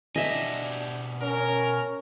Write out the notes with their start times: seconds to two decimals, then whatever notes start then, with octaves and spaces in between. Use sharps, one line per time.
0.16 B2 D4 G4 D#5 E5 G#5
1.22 C#4 A#4